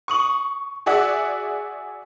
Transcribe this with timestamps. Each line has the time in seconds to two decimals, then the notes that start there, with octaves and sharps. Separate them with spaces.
0.08 C#6 D#6 F#7
0.86 F#4 G#4 D5 E5 F#5